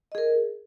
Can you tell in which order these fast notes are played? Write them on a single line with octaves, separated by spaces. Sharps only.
D#5 G#4 A#4